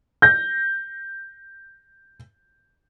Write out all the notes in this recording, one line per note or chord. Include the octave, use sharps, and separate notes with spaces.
G6 A#6